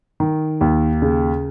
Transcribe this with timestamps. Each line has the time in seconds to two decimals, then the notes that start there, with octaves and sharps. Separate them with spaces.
0.20 D#3
0.61 D#2
1.02 C#3